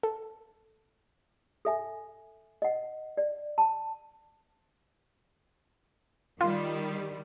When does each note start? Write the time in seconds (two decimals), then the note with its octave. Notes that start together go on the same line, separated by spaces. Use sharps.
0.03 A4
1.65 A4 E5 G#5
2.62 D#5 F#5
3.17 D5
3.58 A5
6.41 D#3 G3 F4